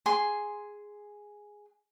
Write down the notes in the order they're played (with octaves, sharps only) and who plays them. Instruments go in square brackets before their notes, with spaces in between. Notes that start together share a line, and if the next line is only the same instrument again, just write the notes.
[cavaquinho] G#4 C6